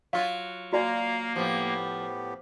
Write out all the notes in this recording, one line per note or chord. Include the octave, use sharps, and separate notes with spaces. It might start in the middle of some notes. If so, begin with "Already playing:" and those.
F#3 F4 F5
A#3 F#4 D5 F5 G#5 A#5
A2 F3 B3 G4